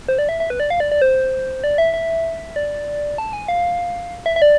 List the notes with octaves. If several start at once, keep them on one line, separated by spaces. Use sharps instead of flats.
C5
D5
E5
E5
B4
D5
F5
D5
D5
C5
D5
E5
E5
D5
A5
G#5
F5
E5
E5
D5